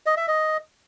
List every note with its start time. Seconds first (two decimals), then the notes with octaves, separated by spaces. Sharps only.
0.06 D#5
0.17 E5
0.28 D#5